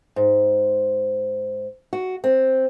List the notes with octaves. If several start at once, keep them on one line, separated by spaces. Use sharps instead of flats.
G#2
F#4
C4